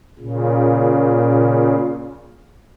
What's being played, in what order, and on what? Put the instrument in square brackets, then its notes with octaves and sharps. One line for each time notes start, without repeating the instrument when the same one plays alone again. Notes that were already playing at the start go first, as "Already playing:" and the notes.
[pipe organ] A#2 C#3